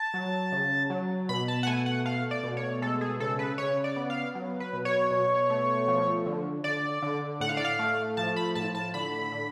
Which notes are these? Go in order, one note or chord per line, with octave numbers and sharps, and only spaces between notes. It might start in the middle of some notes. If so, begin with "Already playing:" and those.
Already playing: A5
F#3
C#3
F#3
B2 B5
A5
F#5
A3 G#5
F#5
A3 F5
D5
B2
C#5
G#3 A4
G#4
C#3 A4
B4
C#3 C#5
D5
B3
F5
F#3
B4
B2
C#5
B2
A3
F3
D3
D3 D5
D3
A2 F#5
F5
D5
F5
A3
F3 A5
B5
A2 A5
A5
D3 B5
D3